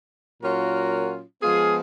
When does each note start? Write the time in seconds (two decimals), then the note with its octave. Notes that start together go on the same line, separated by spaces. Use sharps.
0.42 A#2 F#3 C#4 F4 F#4 A#4
1.42 F3 G#3 B3 F4 G#4